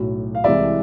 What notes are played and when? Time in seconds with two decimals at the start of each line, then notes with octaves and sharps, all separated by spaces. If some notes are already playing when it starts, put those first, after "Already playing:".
Already playing: B1 A2 F#3
0.35 F5
0.44 C2 C3 E3 G#3 D5 E5